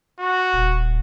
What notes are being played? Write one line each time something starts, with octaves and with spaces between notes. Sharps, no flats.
F#4
D#1